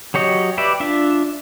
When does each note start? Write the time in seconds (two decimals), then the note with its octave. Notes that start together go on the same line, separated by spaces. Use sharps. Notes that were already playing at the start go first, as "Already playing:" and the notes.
0.14 F#3 G4 C#5 D#5
0.58 G4 B4 D5 E5
0.80 D4 F4 E5